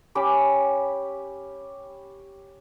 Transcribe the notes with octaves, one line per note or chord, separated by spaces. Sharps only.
C#4 G4 B5 D6